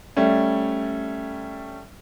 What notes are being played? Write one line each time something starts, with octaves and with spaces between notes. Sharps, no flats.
G3 A3 C#4